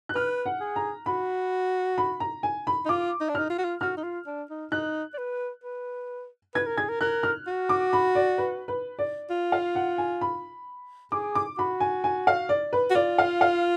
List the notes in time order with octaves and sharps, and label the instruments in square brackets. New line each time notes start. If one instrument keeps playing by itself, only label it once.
[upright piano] F#6
[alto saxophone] B4 [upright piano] F6
[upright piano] F#5
[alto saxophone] G#4
[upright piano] A#5
[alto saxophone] F#4 [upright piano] B5
[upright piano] B5
A#5
G#5
B5
[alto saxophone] D#4
[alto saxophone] F4 [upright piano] D6
[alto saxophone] D#4
D4
[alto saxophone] D#4 [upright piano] F6
[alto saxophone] F4
F#4
F4
[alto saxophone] F#4 [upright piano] F6
[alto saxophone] D#4
F4
D4
D#4
[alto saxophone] D#4 [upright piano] F#6
[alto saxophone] D5
B4
B4
[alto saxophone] B4 [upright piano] G#6
[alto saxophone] A#4
[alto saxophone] G#4 [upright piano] G#6
[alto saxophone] A#4
[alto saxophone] A#4 [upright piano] F#6
[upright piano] F6
[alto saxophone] F#4
[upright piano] D6
B5
D5
B4
B4
D5
[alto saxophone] F4
[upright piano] F5
F#5
G#5
B5
[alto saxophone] G#4 [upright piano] D6
[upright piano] D6
[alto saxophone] F#4 [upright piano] B5
[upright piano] G#5
G#5
F5
D5
B4
[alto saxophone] F#4
[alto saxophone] F4 [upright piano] D5
[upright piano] F5
F5